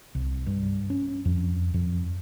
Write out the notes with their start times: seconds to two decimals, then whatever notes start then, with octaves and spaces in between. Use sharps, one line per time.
0.15 C2
0.46 G2
0.90 C#4
1.25 F2
1.74 F2